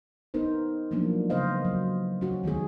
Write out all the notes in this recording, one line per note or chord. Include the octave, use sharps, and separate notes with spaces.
B3 D#4 A#4 C5
F3 F#3 G#3 A#3 B3 D4
C#3 B3 C5 D#5 F5
F#3
C#4 F#4
D#3 G#3 B3 G#4